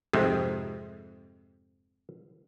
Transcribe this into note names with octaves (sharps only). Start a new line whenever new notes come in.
F2 G#2 C3